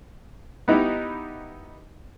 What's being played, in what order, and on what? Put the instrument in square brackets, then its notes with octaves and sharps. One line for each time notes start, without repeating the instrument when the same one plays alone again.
[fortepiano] B3 D#4 E4 G4